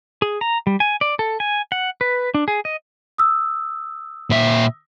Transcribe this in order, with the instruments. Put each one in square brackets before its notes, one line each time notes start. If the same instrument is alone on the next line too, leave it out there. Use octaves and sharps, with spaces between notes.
[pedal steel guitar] G#4
A#5
G3
G#5
D5
A4
G#5
F#5
B4
D4
G#4
D#5
[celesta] D#6 E6
[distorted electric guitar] A#2 E5